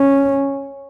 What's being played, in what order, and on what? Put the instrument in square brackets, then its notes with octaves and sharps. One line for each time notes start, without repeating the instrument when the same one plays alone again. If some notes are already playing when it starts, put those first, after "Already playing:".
Already playing: [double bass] C#4